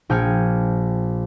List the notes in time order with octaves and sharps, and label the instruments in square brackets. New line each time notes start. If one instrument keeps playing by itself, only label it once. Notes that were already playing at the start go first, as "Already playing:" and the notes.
[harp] A#1 G5 G#5 F6 C#7